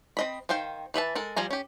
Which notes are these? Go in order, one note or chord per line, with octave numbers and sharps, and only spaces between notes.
C4 D#5 B5
D#3 C5 F5 G5
E3 B4 E5 A5
G#3 A4 A#4
F3 G3 G#5 A#5
C#4 G4